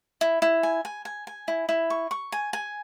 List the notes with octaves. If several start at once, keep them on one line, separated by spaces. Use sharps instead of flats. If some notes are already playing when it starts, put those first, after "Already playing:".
E4
E4
G#5
G#5
G#5
G#5
E4
E4
C#6
C#6
G#5
G#5